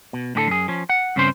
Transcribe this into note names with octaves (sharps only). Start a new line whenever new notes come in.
B2
A2 D3 G4 A4
F#2 G#4
F3 C#4
F#5
G2 C#3 C4 C#4 C5